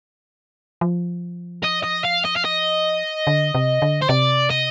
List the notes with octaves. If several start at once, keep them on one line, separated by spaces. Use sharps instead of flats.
F3
D#5
D#5
F5
D#5
F5
D#5
D3
C3
D3
C5
C3 D5
D#5